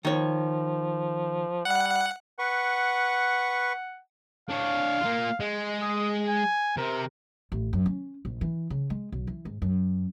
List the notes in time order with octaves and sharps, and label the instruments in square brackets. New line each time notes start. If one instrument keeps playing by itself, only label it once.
[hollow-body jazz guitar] D#3 C#5 [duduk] F3
[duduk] G3 [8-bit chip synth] F#5
[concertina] B4 C#6 [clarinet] F#5
[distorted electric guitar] D4 C#5 [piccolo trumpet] F5
[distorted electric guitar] A#3 F4
G#3
[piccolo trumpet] D#6
G#5
[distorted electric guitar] C3 [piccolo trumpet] A#4
[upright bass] A1
F#2
C#4
A#1
E3
C#3
G#3
B1
E3
G#2
F#2